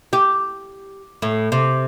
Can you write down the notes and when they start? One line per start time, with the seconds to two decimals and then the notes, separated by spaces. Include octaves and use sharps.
0.13 G4
1.22 A2
1.52 C3